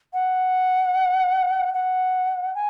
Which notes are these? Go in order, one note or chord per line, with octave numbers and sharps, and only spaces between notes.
F#5
F#5
G#5